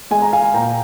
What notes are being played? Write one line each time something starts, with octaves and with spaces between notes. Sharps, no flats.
G#3 G#5
A#5
F5 G#5
A#2 G5 A#5